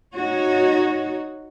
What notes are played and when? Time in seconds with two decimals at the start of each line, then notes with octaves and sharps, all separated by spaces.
0.14 D#4 F#4 C#5